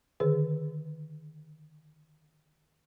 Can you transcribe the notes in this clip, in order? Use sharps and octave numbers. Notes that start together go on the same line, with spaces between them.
D3 D#3 G#4 B4